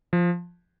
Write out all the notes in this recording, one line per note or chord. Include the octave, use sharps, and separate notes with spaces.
F3